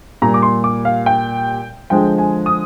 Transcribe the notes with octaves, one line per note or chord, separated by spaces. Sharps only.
A#2 G3 A#5
D6
C6
D6
F5
G5
D3 F3 G#3 G5
G#5
D#6